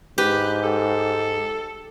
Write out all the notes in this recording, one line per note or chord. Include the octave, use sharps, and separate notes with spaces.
G#2 G4 B4
A4